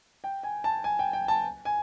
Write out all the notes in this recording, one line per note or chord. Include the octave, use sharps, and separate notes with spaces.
G5
G#5
A5
G#5
G5
G5
A5
G#5